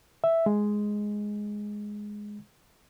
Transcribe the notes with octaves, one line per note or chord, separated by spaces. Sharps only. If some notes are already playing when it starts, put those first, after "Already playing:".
E5
G#3